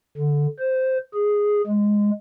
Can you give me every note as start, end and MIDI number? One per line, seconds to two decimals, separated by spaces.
0.18 0.47 50
0.59 0.98 72
1.14 1.61 68
1.66 2.10 56